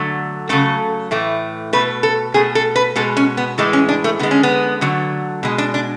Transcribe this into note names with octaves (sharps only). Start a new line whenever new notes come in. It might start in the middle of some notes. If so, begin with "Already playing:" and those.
Already playing: D3 F#3 A3
C#3 F#3 A3 A4
A2 E3 A3
B2 A3 B4
A4
B2 A3 G#4
A4
B4
B2 G#3 A4
C#4
B3
A2 E3 G#3 A3
C#4
D4
A3
D3 G#3 B3
C#4
B3
D3 F#3 A3
B2 G#3
D4
D4